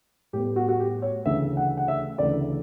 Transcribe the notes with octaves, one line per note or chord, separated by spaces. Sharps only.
A2 G3 B3 G4
F#4
F#4
G4
C#5
D2 C#3 E3 A3 E5
F#5
F#5
E5
D2 C#3 E3 A3 D5